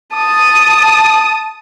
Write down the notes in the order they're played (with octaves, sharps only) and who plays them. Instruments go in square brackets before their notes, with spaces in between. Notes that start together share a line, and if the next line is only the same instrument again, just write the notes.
[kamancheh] A5 D#6